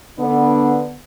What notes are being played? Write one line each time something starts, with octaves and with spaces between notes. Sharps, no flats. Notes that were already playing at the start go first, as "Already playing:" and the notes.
D3 B3 D4